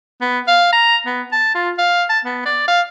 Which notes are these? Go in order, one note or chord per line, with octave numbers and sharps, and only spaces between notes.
B3
F5
A#5
B3
A5
F4
F5
A5
B3
D5
F5